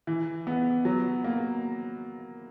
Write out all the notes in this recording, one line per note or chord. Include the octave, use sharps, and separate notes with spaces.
E3
B3
F#3
A#3